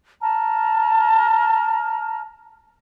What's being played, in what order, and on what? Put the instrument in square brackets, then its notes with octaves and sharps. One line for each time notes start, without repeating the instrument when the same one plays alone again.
[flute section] A5 A#5 F6